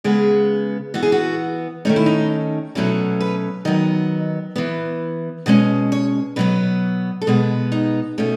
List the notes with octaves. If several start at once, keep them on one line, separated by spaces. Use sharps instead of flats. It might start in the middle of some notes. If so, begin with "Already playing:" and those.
C#3 G#3 B3 G#4
E3 B3 F#4
G#4
F#4
D#3 A3 C#4 D#4
E4
D#4
B2 F#3 A3 C#4 E4
B4
D#3 F#3 B3 D#5
E3 B3
B2 G#3 C#4 D#5
C#5
B2 F#3 B3 B4
A4
B2 G#3 B3 B4
D#4
B2 A3 C#4